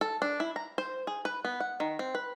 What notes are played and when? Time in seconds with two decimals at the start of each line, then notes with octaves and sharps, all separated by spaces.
0.01 A4
0.22 D4
0.40 E4
0.56 A#5
0.78 C5
1.07 G#4
1.25 B4
1.45 B3
1.60 F#5
1.80 D#3
1.99 C4
2.15 B4